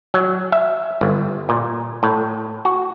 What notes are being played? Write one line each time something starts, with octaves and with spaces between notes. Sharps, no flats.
F#3
E5
G1
A#2
A2
F#4